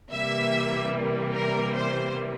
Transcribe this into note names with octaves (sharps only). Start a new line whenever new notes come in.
C3 E3 G3 A#3 E5
A#4
C5